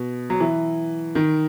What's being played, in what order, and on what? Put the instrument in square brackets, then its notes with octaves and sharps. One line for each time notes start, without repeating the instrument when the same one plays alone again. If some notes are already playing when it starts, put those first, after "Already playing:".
Already playing: [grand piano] B2
F#3
E3
D#3